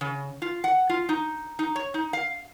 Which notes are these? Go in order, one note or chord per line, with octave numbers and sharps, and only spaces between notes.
C#3
F4
F#5
F4
D#4
D#4
C#5
D#4
F5